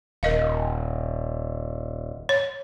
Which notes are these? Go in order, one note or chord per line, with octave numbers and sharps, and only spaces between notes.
D#1 A#4 D#5 F5
C#5